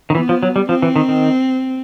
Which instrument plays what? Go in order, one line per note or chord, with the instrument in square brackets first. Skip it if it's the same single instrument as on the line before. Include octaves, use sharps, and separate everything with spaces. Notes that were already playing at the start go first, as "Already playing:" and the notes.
[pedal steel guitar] D#3
[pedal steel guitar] E3 [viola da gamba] B3
[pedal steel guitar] F3
F#3
G3
[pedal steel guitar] F3 [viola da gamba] C4
[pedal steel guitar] E3
D#3
D#3